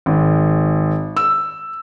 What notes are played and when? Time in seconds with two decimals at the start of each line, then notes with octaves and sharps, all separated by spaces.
0.06 G#1
1.17 E6